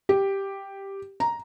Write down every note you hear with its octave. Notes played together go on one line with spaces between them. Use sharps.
G4
A#5